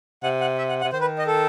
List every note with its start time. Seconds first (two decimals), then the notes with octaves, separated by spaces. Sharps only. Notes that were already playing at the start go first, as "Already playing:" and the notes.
0.23 C3 F#5
0.41 F#5
0.58 E5
0.69 F#5
0.81 F#5
0.84 C3
0.92 D#3 C5
1.01 B4
1.18 D#5
1.27 A4